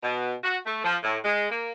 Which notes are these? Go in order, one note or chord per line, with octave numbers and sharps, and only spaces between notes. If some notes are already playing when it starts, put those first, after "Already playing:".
B2
F#4
A3
F3
A2
G#3
A#3